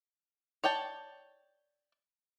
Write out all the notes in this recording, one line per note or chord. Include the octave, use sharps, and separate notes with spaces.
C#5 D5 G5 A5